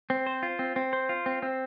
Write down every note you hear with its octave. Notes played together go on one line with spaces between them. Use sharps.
C4
C5
F4
C4
C4
C5
F4
C4
C4